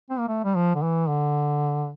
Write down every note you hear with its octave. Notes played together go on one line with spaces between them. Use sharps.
C4
A#3
A3
G3
F3
D3
E3
D3